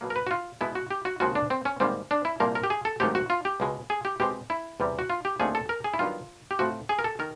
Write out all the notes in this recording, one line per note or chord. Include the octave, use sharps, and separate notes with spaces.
B2 F#3 A#3
A#4
B4
F#4
F4
B2 G#3 B3 E4
F#4
G4
F#4
D#2 C#3 F3 G#3 C4 F#4
D4
C4
C#4
G#2 D#3 G3 A#3 C4
D4
E4
C2 A#2 F3 A#3 A#4
A#4
G4
G#4
A4
G#2 D#3 F#3 A3 C4 G4
F#4
F4
G4
C#2 B2 G#3
G#4
G4
B2 G#3 C4 G4
E4
E2 C3 E3 G3
F#4
F4
G4
D#2 D3 F3 A3 C4 G#4
A4
A#4
G#4
E4
G2 D#3 F#3 B3 F4
G4
A2 F3 A3 C4 F#4
G#4
A#4
A4
D#3 A#4